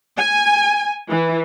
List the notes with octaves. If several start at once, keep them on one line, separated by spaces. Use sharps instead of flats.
G#5
E3